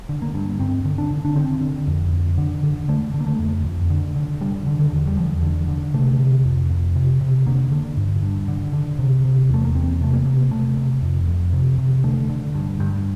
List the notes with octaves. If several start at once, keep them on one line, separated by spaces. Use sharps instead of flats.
D3
A#3
G2
G2 C4
D3
D4
D3
D4
D3 C4
D3
F2
F2
D3
D3
D3 A3
D3
A#3
A3
F2
F2
D3
D3
D3 G3
D3
D3
E2
G3
E2 F3
D3
D3
C3 A3
C3
F2
F2
C3
C3
D3 A#3
D3
G2
G2
D3
D3
C3
C3
E2 A3
A#3
E2 C4
C3 A3
A#3
C3
C3 A3
C3
F2
F2
C3
C3
D3 A3
D3
G2
G2